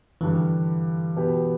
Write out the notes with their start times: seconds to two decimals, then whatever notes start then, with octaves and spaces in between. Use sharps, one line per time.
0.21 G2 D3 E3 G3
1.16 B2 B3 G4 B4